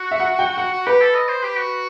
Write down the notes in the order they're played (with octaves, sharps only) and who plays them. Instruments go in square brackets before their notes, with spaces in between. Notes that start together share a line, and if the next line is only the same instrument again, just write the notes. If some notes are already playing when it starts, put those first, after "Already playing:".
Already playing: [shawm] F#4
[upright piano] E5
F#5
G5
[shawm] F#4 [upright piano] F#5
[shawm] F#4
[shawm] G4 [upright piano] B4
[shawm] A4
D#5
C5
G4
F#4